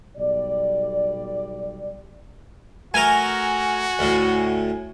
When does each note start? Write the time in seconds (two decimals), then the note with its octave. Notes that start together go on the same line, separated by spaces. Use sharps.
0.17 B1 B2 G3 D5
2.94 A3 F#4 A#4 G#5
3.99 D2 A2